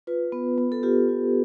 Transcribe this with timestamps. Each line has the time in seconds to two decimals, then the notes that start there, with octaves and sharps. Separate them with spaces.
0.07 F4 B4
0.32 B3
0.58 B3
0.72 A4
0.83 F4 G4
1.08 F4